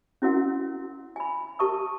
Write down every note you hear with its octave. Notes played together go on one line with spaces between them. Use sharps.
C#4 E4 F#4 A#4 F#5
G#5 B5
G4 A#4 A5 C#6 D#6